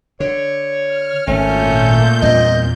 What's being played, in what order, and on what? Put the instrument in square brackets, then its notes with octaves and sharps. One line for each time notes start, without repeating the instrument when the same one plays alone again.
[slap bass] D3 [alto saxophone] C#5
[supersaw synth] F6
[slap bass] G#1 [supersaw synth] A#2 G6 [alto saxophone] A3 [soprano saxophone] C#4
[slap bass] E2 G2 C4 [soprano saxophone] D#5